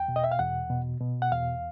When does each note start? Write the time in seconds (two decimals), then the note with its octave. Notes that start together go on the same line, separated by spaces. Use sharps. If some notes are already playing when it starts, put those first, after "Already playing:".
Already playing: E2 G5
0.08 B2
0.16 D#5
0.24 E5
0.32 F5
0.39 E2 F#5
0.70 B2
1.01 B2
1.22 F#5
1.32 E2 F5